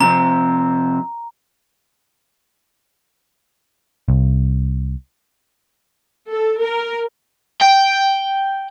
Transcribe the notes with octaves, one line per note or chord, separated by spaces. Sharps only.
C3 F3 C4 A#5
C2
A4
A#4
G5